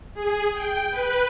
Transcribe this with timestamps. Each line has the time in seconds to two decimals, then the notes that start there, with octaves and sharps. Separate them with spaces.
0.14 G#4
0.53 G5
0.91 B4